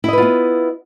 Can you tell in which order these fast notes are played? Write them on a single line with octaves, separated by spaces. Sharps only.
E4 D#5 B4 F4 B3